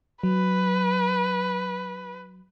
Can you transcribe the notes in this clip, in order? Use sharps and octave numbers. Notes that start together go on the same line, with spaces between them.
F#3 B4